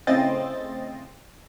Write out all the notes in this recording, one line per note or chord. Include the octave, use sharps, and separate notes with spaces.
A2 C#3 C4 D#5 A6